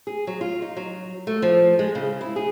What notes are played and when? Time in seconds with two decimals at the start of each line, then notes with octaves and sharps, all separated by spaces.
0.07 G#4
0.27 F#3
0.41 F4
0.62 D#4
0.77 F#3
1.27 A3
1.42 F3
1.79 G#3
1.95 C#3
2.21 E4
2.36 G#4